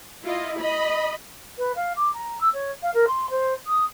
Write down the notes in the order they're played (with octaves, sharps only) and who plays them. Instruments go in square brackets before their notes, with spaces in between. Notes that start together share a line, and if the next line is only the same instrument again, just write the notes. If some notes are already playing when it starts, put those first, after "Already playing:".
[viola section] E4 F4 D#5
D#5 B5
[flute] B4
F5
D6
A#5
E6
C#5
F5
A#4
C6
C5
D#6